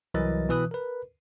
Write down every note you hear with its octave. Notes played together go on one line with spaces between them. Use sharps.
C2 E3 F#3 A#4 D#5 A6
B2 E3 B4 D#6 F#6
A#4 B4